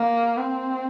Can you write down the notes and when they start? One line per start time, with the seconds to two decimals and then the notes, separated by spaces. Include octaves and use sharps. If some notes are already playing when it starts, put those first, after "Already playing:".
Already playing: A#3
0.37 C4